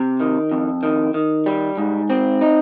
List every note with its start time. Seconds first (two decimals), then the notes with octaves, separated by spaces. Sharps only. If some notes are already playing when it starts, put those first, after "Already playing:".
Already playing: C3
0.20 D#3
0.52 F2
0.83 D#3
1.14 D#3
1.46 G3
1.78 G#2
2.10 C4
2.41 D#4